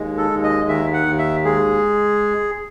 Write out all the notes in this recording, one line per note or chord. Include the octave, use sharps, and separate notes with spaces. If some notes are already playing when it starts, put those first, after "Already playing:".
Already playing: D#2 G#3
A4
D#2
D#5
D#3 E5
F#5
D#2
E5
G#3 G#4